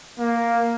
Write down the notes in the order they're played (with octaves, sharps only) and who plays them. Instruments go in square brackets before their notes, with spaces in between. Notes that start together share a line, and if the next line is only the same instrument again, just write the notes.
[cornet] A#3